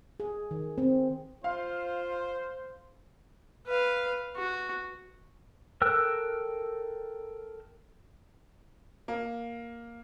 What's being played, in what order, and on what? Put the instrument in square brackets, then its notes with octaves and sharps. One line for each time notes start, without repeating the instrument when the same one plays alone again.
[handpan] G#4
D#3
C4
[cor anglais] F4 [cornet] C5 [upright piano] F5
[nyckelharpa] B4 F5
F#4
[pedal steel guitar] A4 A#4 G5 E6 F#6
[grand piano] A#3